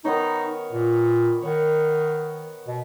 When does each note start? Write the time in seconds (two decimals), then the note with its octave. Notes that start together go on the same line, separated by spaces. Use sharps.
0.05 D#3 B3 D#4 C#5
0.73 A#2
1.42 D#3 C#5 F#5
2.68 B2